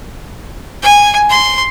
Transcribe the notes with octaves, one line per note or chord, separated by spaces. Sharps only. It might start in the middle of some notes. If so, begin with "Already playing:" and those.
G#5
C6